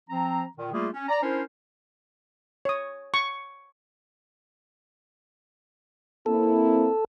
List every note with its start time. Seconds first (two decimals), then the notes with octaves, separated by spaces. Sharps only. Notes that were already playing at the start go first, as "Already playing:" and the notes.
0.10 F3 C4 A#5
0.58 A#2 D#3
0.73 G3 A3 A#3 F4 G#4
0.94 C#4
1.09 D5 A#5
1.23 C#4 D4 E4 A#4 C5
2.65 C#5 D#6
3.14 C#6
6.26 A#3 C4 E4 A4